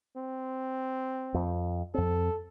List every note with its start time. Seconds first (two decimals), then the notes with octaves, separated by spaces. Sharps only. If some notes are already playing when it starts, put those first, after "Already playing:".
0.17 C4
1.34 F2
1.94 F2 C4 A4